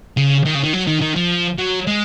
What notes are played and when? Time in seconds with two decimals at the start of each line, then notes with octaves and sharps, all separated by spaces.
0.17 C#3
0.45 D#3
0.55 C#3
0.63 D#3
0.73 F#3
0.87 D#3
1.01 D#3
1.16 F3
1.58 F#3
1.87 G#3